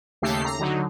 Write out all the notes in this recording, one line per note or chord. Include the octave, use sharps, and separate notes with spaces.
D#2 C#3 A3 G4 A4 C7
A#5
D3 F#3 D#4